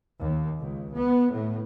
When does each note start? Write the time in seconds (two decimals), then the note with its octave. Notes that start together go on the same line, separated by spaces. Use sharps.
0.19 D#2
0.60 C#2
0.94 B3
1.30 A2